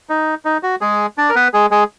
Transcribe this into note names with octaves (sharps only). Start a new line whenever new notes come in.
D#4
D#4
F#4
G#3 G#4
D4 D5
A#4
B3 B4
G#3 G#4
G#3 G#4